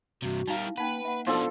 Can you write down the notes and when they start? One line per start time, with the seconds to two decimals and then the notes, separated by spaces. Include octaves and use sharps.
0.22 G2 C3 F#4
0.48 G3 D#4 A#4 F5
0.66 E4
0.78 A#3 C#4 D#4 B4 F#5
1.05 A#3 E5 F#5
1.27 B2 F3 D4 D#4 F#4 A4 C6